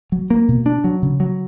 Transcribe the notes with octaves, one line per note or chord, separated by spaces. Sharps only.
F#3
A#3
B2
D4
F#3
C#3
F#3